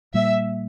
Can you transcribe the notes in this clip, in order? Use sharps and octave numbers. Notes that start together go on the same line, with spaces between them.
A#2 G3 A#3 E5